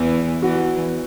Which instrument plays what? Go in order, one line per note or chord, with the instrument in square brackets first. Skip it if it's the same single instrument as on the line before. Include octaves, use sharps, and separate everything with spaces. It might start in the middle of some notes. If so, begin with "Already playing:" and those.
Already playing: [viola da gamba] E2 E3
[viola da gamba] E2 E3 [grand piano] F#4